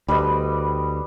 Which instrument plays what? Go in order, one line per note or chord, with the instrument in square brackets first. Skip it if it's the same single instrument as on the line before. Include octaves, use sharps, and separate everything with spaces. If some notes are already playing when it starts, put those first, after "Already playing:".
[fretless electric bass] D2 [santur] G3 B4 D#5